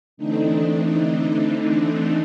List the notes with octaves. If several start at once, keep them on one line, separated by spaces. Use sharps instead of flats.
D3 E3 A3 C4 D4 D#4